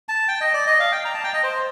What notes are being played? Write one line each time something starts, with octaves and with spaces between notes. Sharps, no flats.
A5
G5
D#5
D5
D#5
F5
G5
A#5
A5
G5
D#5
C5